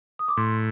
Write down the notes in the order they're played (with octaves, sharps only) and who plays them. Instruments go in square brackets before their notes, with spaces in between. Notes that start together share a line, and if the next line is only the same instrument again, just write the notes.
[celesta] D#6
D6
[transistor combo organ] A2 [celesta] C6